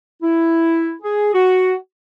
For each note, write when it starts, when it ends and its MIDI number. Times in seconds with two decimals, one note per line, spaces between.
0.23 0.94 64
1.02 1.31 68
1.34 1.74 66